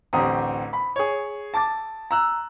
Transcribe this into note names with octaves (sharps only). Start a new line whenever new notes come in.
A1 D2 C4 G4 A#5 D#6
B5
G#4 C#5
A5 D6 A6
A#5 E6 F#6